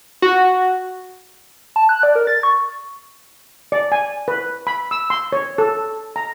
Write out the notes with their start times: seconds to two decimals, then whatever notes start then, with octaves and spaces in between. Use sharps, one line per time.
0.22 F#4
1.76 A5
1.89 F#6
2.03 D5
2.15 A#4
2.27 A6
2.43 C#6
3.72 D5
3.92 G#5
4.28 B4
4.67 B5
4.91 E6
5.10 C6
5.32 C#5
5.58 A4
6.16 A#5